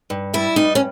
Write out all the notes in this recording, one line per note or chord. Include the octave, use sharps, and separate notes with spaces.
G2
G3 E4
G2 D#4
C#4